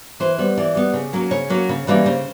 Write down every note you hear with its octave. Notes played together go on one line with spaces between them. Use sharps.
E3 C5
G3 B3
E3 D5
G3 B3
C#3
F#3 A#3 C#4
C#3 C#5
F#3 A#3 C#4
C#3
E3 G3 A#3 C#4
C#3 C5